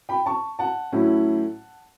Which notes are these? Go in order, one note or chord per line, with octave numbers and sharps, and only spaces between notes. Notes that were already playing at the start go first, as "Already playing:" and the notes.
G5 B5
A5 C#6
F#5 A5
A2 F#3 C#4 E4